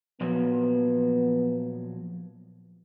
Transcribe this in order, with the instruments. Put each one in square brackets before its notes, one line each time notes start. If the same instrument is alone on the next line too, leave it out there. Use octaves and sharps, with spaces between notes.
[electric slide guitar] A#2 F3 F#3 [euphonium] B3